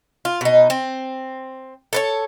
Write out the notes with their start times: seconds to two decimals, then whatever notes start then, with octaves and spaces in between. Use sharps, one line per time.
0.25 F4
0.41 B2 D#4
0.70 C4
1.93 A4 B4 C#5